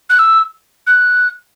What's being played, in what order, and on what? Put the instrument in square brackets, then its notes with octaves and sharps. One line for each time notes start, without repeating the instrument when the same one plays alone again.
[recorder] F#6
E6
F#6